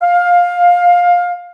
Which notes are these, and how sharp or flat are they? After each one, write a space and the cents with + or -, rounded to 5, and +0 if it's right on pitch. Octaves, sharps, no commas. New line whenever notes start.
F5 +15